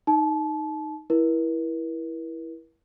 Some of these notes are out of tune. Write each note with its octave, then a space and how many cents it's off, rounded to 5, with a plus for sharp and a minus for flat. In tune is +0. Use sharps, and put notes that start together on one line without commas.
D#4 +0 A5 -30
E4 +0 A#4 +45